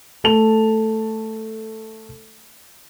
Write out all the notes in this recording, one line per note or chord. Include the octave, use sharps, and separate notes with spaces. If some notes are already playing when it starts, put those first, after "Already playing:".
A3 A4 A5 F7